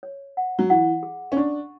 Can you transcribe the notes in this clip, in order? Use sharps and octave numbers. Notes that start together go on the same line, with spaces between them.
C#5
F#5
F#3
E3 F#5
G#4
C#4
D4 C#6